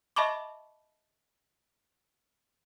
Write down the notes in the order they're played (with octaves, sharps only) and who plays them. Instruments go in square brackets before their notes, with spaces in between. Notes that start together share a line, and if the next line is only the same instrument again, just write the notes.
[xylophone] D#5 E5 A5 B5 C#6 D6